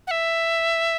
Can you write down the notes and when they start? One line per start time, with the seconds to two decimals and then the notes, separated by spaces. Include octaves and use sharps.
0.07 F#5
0.11 E5